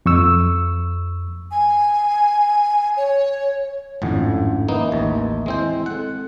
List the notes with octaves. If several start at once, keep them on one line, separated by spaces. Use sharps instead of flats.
F2 C#6 E6
G#5
C#5
G#1 F2 A2 C#4 D4 F#5
A#3 B3 D#4 D#5 E5
A1 D#2
G#3 C4 E4 C5
G#3 C4 A4 F#5